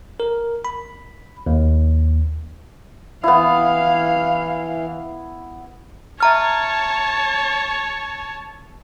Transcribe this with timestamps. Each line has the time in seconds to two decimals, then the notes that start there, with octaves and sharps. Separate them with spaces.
0.20 A#4
0.65 B5
1.46 D#2
3.24 E3 B3 E4 F5
6.20 C#5 E5 A5 A#5 F6